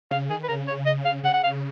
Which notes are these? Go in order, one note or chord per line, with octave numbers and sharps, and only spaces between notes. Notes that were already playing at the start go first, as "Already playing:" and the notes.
C#3 F5
D#3 G#4
B4
C#3 A#4
C#5
D#5
F5
C#3 F#5
F#5
F5